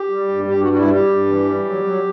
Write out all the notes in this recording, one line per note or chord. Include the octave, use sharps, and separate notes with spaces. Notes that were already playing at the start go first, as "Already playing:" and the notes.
Already playing: G4
G3
G2
G2 G4
F#4
G3
F#4
E4
G3 G4
G2
E3
G3
F#3
F#3